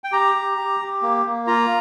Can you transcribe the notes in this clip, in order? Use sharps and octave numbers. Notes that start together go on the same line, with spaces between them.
G5
G4 A#5
G4
G4
G4
A#3
A#3
F4 A#5